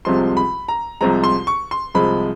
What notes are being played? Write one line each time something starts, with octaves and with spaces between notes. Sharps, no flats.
C2 C3 F3 G#3 C6
B5
A#5
C2 C3 F3 G#3 A#5
C6
C#6
C6
C2 C3 F3 G#3 B5